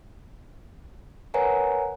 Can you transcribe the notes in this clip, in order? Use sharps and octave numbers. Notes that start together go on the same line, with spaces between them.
A#4 B4 C#5 F#5 G#5 A#5